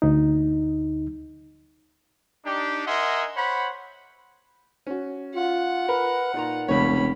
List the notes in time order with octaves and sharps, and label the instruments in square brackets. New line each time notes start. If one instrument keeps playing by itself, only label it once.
[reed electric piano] D2 D#4
[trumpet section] D4 D#4 G4
A#4 D#5 E5 F#5 G#5 C6
C5 C#5 F#5 B5
[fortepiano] C#4 F#4
[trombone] F4 [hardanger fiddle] F#5
[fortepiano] A#4 [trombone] B4
[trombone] A#2 [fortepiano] D#4 F4 A#5
[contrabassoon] F1 [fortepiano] C#2 C#5 [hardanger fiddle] C#4 B5